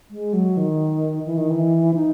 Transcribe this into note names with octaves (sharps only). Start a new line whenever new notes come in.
G#3
F#3
D#3
E3
D#3
E3
D#4